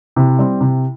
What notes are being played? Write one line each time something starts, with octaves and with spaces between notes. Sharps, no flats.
C3 E4
G3 C4
C3